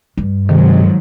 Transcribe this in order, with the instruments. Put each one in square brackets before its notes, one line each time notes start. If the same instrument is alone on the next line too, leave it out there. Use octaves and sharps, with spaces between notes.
[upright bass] G2
[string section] G#2 F3 F#3 [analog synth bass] C3 [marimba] D#3